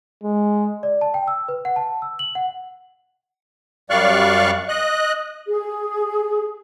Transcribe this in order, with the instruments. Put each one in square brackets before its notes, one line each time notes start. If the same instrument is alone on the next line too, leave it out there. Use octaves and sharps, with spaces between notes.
[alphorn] G#3
[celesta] D5
A5
G5
E6
B4
F#5
A5
E6
F#7
F#5
[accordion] F#2 G3 D5 F5 C#6 F#6
D#5 F#6
[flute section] G#4